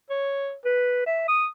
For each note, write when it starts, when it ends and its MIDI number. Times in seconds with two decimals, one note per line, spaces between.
0.10 0.55 73
0.65 1.06 71
1.06 1.27 76
1.28 1.47 87